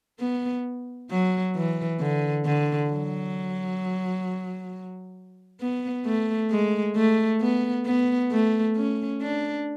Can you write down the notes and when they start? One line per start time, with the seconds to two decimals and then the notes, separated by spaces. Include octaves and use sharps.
0.20 B3
1.11 F#3
1.55 E3
2.00 D3
2.45 D3
2.91 F#3
5.61 B3
6.06 A3
6.51 G#3
6.96 A3
7.41 B3
7.86 B3
8.32 A3
8.76 C#4
9.22 D4